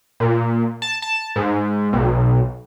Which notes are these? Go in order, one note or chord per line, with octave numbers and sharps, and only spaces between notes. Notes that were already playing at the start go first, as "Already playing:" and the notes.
A#2
A5
A5
G#2
B1